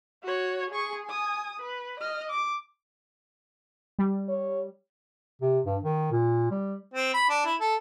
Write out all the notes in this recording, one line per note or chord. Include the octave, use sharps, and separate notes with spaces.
F#4 C#5
G#4 C#6
G#5 D#6
B4
D#5 F6
D6
G3
C#5
C3
G2
D#3
A#2
G3
C4
B5
D4
E4
A4